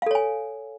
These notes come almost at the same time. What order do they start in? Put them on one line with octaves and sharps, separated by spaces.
F5 A4 C#5 G#5